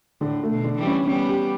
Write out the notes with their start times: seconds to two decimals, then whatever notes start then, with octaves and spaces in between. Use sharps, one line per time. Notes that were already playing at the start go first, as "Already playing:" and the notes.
0.21 A2 D3
0.43 A3
0.50 B2
0.64 D3
0.79 E3 G3
0.87 C#4
1.07 G3 B3 C#4
1.29 G4